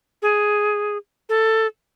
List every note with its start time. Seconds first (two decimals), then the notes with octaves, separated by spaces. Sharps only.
0.22 G#4
1.29 A4